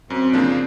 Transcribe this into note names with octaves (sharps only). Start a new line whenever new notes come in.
F#2 C4
C#3 F3 A#3 D4